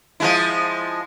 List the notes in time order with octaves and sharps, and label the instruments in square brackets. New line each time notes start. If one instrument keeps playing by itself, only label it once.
[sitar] F3 G#3 E4